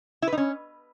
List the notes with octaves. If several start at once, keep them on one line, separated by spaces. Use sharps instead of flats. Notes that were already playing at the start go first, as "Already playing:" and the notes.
E4
B4
D#4
C#4